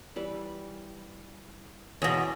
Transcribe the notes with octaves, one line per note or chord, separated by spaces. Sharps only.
E3 G3 B4
E2 B2 E3 G#3 C#4